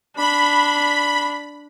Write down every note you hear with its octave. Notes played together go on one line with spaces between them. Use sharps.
D4 B5